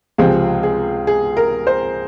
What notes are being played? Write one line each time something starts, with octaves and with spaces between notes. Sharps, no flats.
C#2 C3 F3 C4 G#4
G#4
G#4
A#4
C5